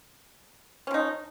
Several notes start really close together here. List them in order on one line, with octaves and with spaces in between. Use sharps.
C#4 F3 D#4